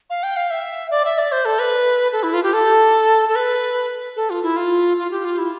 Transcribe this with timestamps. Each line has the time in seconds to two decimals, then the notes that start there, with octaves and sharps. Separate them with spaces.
0.10 F5
0.23 G5
0.36 F5
0.51 E5
0.91 D5
1.05 E5
1.18 D5
1.32 C5
1.45 A4
1.59 B4
2.12 A4
2.23 E4
2.34 F4
2.43 G4
2.53 A4
3.29 A4
3.36 B4
4.16 A4
4.30 F4
4.43 E4
4.57 F4
4.98 F4
5.11 G4
5.25 F4
5.38 E4